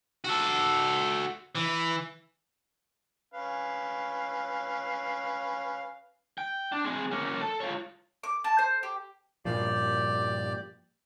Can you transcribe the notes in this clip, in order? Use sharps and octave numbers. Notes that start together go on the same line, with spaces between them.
F#4 A4
E3
C#4 B4 F5
G5
D4
C4 G#4
A#3 C#4
A4
F4 C#5
D6
A5
C5
G4
G2 A#2 F3 G4 D5